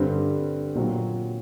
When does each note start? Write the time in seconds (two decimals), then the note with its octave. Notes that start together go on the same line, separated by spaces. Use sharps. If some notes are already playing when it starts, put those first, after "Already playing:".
Already playing: G2 D3 G3 C4
0.75 A#2 F#3 C4 F#4